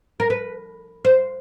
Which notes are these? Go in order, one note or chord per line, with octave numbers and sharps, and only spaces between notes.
A#4
B4
C5